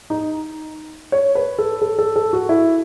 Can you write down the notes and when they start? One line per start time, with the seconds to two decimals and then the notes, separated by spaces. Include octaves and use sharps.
0.10 D#4
1.12 C#5
1.35 B4
1.59 A4
1.82 A4
1.99 A4
2.16 A4
2.33 F#4
2.49 E4